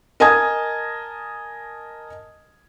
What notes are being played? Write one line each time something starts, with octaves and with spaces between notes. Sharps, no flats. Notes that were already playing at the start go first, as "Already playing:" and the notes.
A#4 D#5 G#5 A5 D#6 G#6